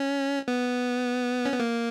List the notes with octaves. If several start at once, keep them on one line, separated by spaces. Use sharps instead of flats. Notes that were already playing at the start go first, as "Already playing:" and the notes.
Already playing: C#4
B3
C#4
B3
A#3